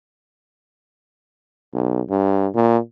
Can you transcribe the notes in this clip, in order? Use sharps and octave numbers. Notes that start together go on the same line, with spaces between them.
B1
G2
A#2